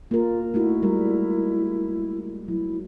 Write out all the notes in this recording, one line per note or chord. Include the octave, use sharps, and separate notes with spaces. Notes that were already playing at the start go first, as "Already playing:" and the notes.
A#3 F4 A#4
A3 D#4 E4 F#4
G3 G#3 A#4
F#3 E4